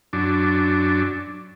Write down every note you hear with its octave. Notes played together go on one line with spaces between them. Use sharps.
F#2 D4